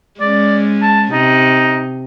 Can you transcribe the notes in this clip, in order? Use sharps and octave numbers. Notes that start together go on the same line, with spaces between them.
G#3 C#4 D5
A5
C3 D#4